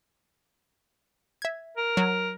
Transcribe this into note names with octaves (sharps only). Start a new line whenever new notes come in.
E5 G#6
A#4
F#3